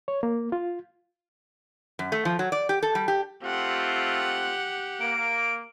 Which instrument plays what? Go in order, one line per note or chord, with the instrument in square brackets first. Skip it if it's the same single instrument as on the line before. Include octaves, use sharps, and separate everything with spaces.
[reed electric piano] C#5
A#3
F4
[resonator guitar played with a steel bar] F#2
A3
F3
F#3
D5
G4
A4
G3
G4
[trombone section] A3 C4 F4 [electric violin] G4 F#5
[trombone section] A#3 [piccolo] D7